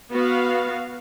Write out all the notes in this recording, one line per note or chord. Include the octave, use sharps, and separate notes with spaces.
B3 F#4 F5